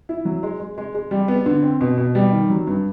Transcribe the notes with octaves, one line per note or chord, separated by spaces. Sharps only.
E4
F#3
G#3
G#3
G#3
G#3
G3
B3
D3
C4
B2
B2
G3
D#3
F#3
G2